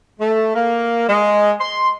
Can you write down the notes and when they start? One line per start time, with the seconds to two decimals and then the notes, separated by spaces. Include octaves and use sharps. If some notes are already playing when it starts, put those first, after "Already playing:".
0.20 A3
0.54 A#3
1.07 G#3
1.60 C6